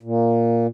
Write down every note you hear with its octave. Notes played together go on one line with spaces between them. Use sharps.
A#2